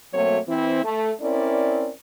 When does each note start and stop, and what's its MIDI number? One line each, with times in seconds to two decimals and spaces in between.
0.13 0.39 47
0.13 0.39 54
0.13 0.39 57
0.13 0.39 58
0.13 0.39 60
0.13 0.39 73
0.48 0.80 52
0.48 0.80 60
0.48 0.80 64
0.84 1.12 57
1.21 1.90 60
1.21 1.90 61
1.21 1.90 64
1.21 1.90 70
1.21 1.90 74